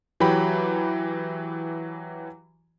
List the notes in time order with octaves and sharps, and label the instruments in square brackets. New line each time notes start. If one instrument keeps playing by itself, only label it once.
[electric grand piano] E3 F#3 G4 B5